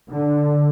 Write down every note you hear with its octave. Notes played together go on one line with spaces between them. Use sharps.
D3